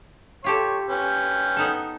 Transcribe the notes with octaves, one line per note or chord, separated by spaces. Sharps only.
F4 G4 A4 C#5
C#4 B4 G5
B3 D#4 A4